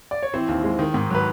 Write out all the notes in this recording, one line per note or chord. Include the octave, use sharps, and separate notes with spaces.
D5
C#5
E3 C4 C5
D#2
G#3
D#3
G#2
F#3 B4